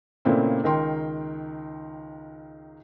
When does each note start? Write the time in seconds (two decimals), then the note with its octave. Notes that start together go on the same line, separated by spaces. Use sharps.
0.25 A#2 C#3 A3 A#3 C4 E4
0.63 C#2 D#3 A#4 G5 C6